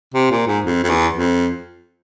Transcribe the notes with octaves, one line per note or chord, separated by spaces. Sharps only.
C3
A#2
G#2
F2
F2
E2
F2